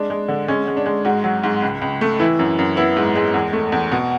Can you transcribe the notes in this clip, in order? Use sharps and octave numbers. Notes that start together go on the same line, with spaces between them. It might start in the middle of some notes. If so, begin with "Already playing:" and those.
Already playing: G#3 D4
G#3
D3
G#3 C#4
G#3
D4
G#3
G#2 F#4
F#3
G#2
C#2
C#2
A3
E3 E4
F#2
F#2
B3 E4
G#2
G#3
E2
A3
E2
B2 F#4